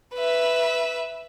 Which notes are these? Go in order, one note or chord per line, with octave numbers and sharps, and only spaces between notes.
B4 E5